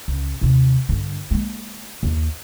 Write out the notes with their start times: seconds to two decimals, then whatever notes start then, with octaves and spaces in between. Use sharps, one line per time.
0.08 C#2
0.41 D#2 C3
0.89 G2 D3
1.31 G#3 A#3
2.03 D#2